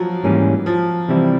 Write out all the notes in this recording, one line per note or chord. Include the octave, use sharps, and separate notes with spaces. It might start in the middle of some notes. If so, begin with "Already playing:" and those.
Already playing: F3 F#3
G#2 E3 G3 A#3 C#4
F3
C3 E3 G3 C4 E4